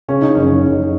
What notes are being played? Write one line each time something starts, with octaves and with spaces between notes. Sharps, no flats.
C#3 C#4
D#4
F#1 C#4
F#1